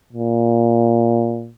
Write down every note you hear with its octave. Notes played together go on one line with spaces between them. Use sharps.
A#2